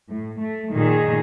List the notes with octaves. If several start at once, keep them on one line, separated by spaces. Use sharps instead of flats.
A2
A3
A#2 D#3 G#4